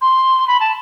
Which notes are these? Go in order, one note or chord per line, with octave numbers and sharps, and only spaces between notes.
C6
B5
A5